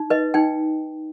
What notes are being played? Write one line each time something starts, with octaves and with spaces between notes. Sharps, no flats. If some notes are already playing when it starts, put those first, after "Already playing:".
Already playing: D#4
B4 D#5
D#4 G5